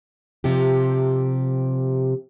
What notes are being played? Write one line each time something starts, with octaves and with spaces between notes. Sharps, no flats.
C3 F3 G4